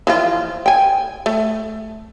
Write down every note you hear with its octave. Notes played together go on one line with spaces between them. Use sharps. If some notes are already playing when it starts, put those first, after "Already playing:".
E3 F3 F4
G5 G#5
A3